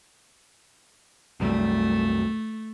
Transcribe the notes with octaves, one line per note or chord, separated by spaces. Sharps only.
C2 F#2 G3 A3